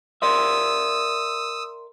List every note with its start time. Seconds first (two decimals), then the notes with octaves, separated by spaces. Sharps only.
0.22 A#4 D5 E5 C6 D#6 E6